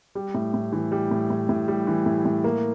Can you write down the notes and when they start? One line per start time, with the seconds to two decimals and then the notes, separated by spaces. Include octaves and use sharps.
0.15 G3
0.34 A2
0.54 A2
0.72 E3
0.92 G3
1.11 A2
1.30 A2
1.49 A2
1.68 G3
1.87 E3
2.06 A2
2.25 A2
2.44 A#3